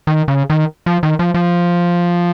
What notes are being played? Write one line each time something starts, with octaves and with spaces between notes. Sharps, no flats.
D#3
C#3
D#3
F3
D#3
F3
F3